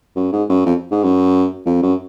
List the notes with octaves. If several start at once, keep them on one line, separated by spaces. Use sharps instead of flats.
F#2
G#2
F#2
F2
G#2
F#2
F2
F#2